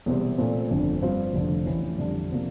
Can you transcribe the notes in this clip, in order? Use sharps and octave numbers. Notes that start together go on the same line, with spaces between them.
E1 E2 C3 G3 C4
A#2 A3 C4
G1 F2 D3
G2 F3 C4 F4
F1 F2 D3 A3
A1 A2 E3
F2 D3 G3 D4
C3 F3 A#3